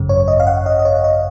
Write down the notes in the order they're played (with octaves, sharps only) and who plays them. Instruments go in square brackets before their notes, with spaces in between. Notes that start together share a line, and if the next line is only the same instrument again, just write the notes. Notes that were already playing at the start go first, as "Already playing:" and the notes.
Already playing: [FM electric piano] G#1 F#2 C#3
C#5
D#5
F5
F#5
D#5
D#5
C#5
D#5